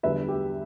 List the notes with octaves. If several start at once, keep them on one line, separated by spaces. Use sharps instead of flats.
E2 D3 G3 B4 E5
G4